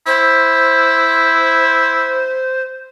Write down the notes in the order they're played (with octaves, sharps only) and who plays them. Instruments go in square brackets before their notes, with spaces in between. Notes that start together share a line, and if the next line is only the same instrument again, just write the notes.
[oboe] E4 [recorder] C5